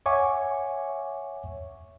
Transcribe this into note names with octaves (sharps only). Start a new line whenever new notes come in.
C#5 E5 F#5 G#5 C#6 D6